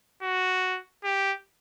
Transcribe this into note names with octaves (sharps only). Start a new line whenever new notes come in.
F#4
G4